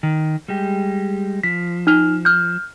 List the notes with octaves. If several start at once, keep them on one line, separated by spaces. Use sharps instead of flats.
D#3
G3 G#3 G4
F3 B6
D#4 F6 F7
F6 G6